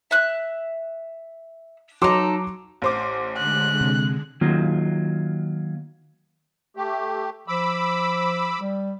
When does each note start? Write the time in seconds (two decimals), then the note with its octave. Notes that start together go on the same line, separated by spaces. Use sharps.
0.11 E5 F#6
2.02 F#3 D#4 A4 C6 D6
2.82 A1 C5 D6
3.37 D3 G#3 F#6
3.81 C3
4.41 D#3 F#3 A#3 F4
6.77 A3 G4
7.48 F3 B5 D6 E6
8.60 G3